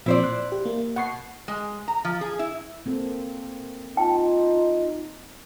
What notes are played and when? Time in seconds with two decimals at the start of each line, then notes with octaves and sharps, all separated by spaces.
0.06 A#2 F3 C4 E4 C5 D5
0.24 F#6
0.52 G4
0.65 A#3
0.96 B2 F#5 C#6 C7
1.48 G#3
1.88 A#5
2.05 F3
2.21 G#4
2.39 E4
2.86 A#3 C4 A4
3.97 D#4 F4 G5 A5